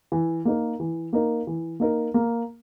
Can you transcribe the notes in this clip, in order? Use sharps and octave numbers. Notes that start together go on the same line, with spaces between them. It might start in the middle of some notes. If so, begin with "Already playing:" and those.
E3
A#3 D#4 A#4
E3
A#3 D#4 A#4
E3
A#3 D#4 A#4
A#3